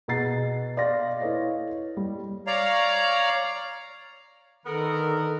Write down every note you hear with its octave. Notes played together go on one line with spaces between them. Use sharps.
B2 G#4 F#5 A#5 A6 C7
D5 D#5 F5 C6 A6 A#6
E4 A4 B4 C#5 D#5 F5
G3
C#5 D5 F5 A#5
D3 D#3 B3 A4 A#4